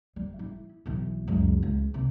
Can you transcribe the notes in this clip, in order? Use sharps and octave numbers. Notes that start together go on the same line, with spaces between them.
G3
E4
B1 E3
C#2 F#2
C#2
C2